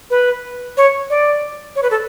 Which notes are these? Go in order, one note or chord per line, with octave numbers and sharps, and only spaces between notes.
B4
C#5
D5
C#5
B4
A4